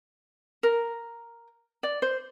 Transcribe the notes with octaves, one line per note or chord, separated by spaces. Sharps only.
A#4
D5
C5